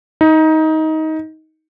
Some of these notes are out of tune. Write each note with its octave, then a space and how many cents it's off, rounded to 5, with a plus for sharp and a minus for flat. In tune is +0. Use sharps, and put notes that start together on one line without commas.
D#4 +20